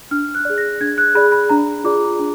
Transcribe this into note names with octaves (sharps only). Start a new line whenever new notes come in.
D4 F6
F#6
G#4 D5
A#6
D4 G#6
F#6
G#4 D5 B5
B5
D4 A#5
F4 G#4 D5 D6
D4